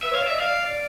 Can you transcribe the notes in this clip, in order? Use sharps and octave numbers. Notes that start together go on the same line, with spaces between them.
B4 E5
C#5
F5
D5
E5
D#5
D5 F5
D5
D5